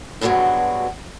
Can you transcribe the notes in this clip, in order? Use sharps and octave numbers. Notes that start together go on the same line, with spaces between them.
G2 B2 D3 D#3 F#3 G#3